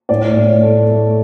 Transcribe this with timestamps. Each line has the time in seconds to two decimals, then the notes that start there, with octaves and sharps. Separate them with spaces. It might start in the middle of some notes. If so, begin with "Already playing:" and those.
0.09 A2 D5
0.36 A2
0.63 A3
0.90 A3